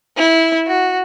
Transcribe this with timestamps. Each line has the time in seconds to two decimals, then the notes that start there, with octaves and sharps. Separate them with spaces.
0.17 E4
0.67 F#4